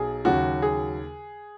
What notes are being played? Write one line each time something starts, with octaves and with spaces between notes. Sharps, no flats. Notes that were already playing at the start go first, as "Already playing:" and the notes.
Already playing: B1 G#4
D#2 C#3 F#3 F#4
G#4